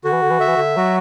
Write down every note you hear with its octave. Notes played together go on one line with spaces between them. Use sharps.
D3 F#4
E3
D3
E3
D3 E5
E3
D3
F#3 F#4